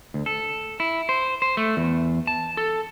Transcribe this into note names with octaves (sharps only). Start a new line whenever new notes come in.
D2
A4
E4
C5
C5
A3
E2
A5
A4